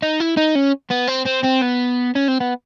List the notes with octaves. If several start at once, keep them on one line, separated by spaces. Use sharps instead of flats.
D#4
E4
D#4
C#4
B3
C4
C4
C4
B3
C#4
C4
B3